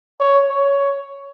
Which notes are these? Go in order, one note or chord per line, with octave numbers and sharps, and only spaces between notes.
C#5
C#5